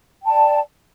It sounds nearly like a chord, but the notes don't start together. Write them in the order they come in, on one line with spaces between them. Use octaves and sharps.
G5 A5 D5